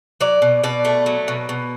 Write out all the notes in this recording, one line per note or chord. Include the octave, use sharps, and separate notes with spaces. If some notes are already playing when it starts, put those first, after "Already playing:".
F#3 D5
B2
B2 D5
A3
F#3
B2
B2